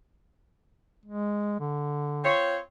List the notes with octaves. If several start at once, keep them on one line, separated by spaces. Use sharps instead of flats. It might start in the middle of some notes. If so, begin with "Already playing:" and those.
G#3
D3
C4 F4 C#5